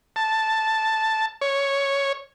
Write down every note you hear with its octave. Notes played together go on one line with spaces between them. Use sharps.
A5
C#5